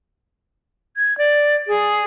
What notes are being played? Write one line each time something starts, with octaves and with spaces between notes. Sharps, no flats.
G#6
D5
G#4